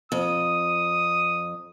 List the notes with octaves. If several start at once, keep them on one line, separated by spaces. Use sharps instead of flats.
F2 D#6